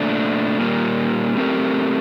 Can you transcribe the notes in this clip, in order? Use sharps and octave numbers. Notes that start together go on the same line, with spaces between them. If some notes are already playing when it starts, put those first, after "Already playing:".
Already playing: A#2 A3 D4
A#2 G3 A#3
A3 C4 G4 A#4